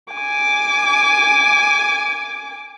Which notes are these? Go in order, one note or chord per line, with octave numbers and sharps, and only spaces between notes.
G#5 D6